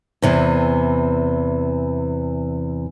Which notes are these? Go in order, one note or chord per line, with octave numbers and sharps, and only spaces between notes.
E2 C3 E3